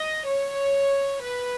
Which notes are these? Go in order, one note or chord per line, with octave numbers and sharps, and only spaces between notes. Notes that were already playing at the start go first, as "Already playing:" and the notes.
Already playing: D#5
C#5
B4